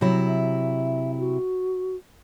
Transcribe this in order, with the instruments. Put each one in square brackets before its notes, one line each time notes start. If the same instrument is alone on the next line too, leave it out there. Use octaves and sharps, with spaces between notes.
[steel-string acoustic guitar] C3 F#3 E4 [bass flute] C#5
[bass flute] E5
F#4